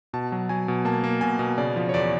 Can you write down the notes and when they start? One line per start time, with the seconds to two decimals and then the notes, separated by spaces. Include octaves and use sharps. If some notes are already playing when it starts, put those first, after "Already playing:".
0.13 B2 A5
0.32 F#3
0.49 F#3 G#5
0.68 B2
0.85 A#3 A5
1.04 A#3
1.21 B2 G#5
1.39 B2
1.58 C#3 D5
1.76 F3
1.89 C#5
1.94 E2 D5